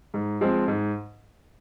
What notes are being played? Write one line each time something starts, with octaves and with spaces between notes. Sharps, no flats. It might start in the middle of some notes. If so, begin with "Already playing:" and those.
G#2
F3 G#3 C4
G#2